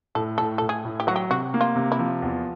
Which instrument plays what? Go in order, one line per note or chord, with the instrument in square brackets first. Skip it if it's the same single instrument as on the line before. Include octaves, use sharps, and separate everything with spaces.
[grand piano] A2 [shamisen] A4
[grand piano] A2 [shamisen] A4
[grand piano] A2 [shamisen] A4
[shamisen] G#4
[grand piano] A2
[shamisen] G4
[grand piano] F#3 [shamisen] F#4
[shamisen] G4
[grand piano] C3 [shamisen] F#4
[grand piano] A#3
[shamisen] F4
[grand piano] C3
[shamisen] E4
[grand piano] F3
E2